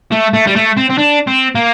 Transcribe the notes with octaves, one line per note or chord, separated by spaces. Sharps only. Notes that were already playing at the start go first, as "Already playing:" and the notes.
A3
A3
G3
A3
C4
C4
D4
C4
A#3